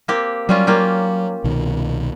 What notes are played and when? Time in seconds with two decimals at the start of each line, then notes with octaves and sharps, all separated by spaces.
0.08 A#3 C4 G4
0.49 F#3 G3 C#4 F4
0.67 A#3 F4 G4
1.44 C2 B2 D#3